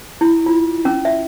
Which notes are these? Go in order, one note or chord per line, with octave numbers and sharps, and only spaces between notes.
E4
F4
C#4
E5